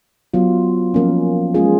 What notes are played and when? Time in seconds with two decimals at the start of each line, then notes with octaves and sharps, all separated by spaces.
0.34 F#3 B3 F4
0.94 F3 A#3 C#4
1.54 G#3 C#4 F4 G#4